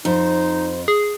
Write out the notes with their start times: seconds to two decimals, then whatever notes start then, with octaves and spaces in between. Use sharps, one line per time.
0.05 F2 D#4 C5
0.88 G#4